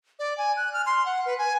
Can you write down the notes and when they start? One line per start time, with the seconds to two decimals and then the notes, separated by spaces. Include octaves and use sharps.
0.19 D5
0.38 G#5
0.57 F#6
0.73 F6
0.86 C6
1.06 F#5
1.26 B4
1.38 G#5